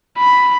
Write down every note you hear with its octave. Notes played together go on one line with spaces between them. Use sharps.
B5